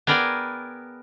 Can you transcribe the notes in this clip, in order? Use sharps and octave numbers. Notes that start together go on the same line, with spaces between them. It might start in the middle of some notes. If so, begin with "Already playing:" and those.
B3 G#4 A#4 D5 G5 G#5